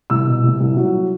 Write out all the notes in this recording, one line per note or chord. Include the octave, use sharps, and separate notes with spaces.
C2 E6
B2
C2
C2
F#3